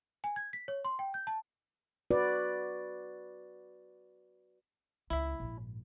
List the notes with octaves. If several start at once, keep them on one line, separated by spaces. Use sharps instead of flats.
G#5
G#6
B6
C#5
C6
G5
G6
A5
F#4 B4 D5
C#2 E4 E5
A#1 G#2